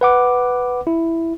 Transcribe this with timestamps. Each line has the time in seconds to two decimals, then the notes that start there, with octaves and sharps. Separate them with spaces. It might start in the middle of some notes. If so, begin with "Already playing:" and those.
0.01 B4 F#5 D6
0.87 E4